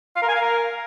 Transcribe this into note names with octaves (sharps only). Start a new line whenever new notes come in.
F5
A#4
G#5
F5
A#4